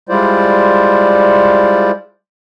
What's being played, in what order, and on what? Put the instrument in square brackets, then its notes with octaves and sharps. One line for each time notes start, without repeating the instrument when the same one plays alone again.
[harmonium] G3 G#3 E4 F4 C5 D5